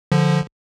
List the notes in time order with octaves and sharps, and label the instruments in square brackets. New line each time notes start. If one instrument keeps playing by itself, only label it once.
[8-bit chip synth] D3 F3